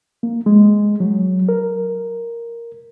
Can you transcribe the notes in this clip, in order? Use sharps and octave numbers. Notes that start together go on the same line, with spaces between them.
A#3
G#3
F#3
A#4